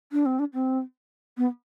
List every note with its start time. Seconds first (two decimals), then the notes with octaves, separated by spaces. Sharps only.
0.12 D4
0.26 C4
0.39 D4
0.54 C4
1.37 B3